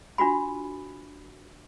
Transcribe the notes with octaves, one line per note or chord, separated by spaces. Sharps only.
D4 F4 F#4 B5